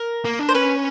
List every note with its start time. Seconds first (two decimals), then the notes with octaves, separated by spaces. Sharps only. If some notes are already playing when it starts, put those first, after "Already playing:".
Already playing: A#4
0.25 A#3
0.39 D4
0.49 C5
0.54 C#4 B4